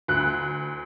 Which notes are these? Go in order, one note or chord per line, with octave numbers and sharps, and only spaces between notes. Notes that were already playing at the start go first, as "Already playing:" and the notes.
D2 F#6